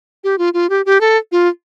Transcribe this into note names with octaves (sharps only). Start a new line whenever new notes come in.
G4
F4
F4
G4
G4
A4
F4